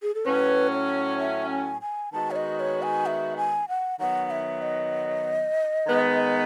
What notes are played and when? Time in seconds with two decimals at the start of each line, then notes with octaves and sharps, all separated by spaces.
0.03 G#4
0.15 A4
0.25 A2 F#3 C#4 B4
0.72 C#5
1.19 E5
1.50 G#5
1.82 G#5
2.12 D#3 G#3 B3 D#4 F#4 A5
2.31 C#5
2.36 D#5
2.60 C#5
2.82 G#5
3.06 E5
3.37 G#5
3.69 F#5
3.99 D#3 F#3 B3 F#5
4.31 E5
4.62 D#5
5.87 D#3 G#3 B3